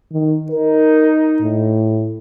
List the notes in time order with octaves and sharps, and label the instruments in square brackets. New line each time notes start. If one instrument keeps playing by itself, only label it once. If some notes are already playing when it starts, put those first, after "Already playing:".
[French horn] D#3
[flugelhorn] D#4 [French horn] A#4
[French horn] A2